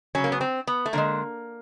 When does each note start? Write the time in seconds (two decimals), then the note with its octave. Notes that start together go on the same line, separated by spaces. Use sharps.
0.15 C#3 F#3 C#4
0.24 A#3
0.32 B3
0.41 C4
0.67 B3
0.86 A3
0.93 D3 F3 G#3 A#3